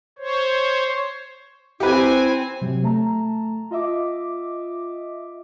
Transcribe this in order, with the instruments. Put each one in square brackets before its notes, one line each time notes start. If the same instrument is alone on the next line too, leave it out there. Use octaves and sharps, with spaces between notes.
[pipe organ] C5 C#5
[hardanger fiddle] C4 G#5 [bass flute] E4 [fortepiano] G4 B4
[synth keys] C3 F#3
A3 A5 A#5
F4 D#5 E5 D6